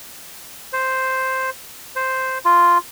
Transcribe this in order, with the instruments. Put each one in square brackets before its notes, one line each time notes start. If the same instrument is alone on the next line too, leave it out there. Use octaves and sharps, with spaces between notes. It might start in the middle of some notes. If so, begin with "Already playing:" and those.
[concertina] C5
C5
F4